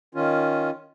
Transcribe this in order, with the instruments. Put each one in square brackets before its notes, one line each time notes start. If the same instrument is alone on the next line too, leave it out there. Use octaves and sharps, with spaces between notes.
[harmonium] D#3 C#4 F4